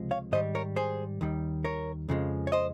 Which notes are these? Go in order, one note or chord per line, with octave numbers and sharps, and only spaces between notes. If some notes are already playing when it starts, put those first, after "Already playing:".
Already playing: C#2 C3 F3 G#3
C#5 F5
G#2 D#3 G3 C5 D#5
A#4 C#5
G#4 C5
D#2 D#3 G3
A#4 C#5
F2 C#3 F3 G#3
C#5
C5 D#5